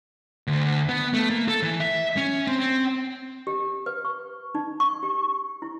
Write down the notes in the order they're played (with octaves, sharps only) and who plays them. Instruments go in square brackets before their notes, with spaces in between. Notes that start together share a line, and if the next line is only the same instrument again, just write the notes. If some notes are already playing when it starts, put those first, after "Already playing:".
[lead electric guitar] D2
B3
A3
A#3
A4
E3
E5
C#4
C4
C4
[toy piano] G4
B4
C#6
D#4
C#6
G4
E4